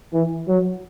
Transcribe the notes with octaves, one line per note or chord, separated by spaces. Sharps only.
E3
F#3